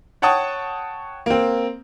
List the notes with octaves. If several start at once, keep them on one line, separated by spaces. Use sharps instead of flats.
C#5 F#5 G5 A5 C#6 D#6
A#3 C4